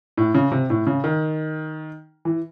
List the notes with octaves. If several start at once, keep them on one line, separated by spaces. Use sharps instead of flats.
A2
C#3
C3
A2
C#3
D#3
E3